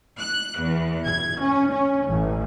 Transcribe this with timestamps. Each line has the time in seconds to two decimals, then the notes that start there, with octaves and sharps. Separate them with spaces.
0.20 F#6
0.60 E2
1.07 G#6
1.42 C#4
1.73 C#4
2.09 A1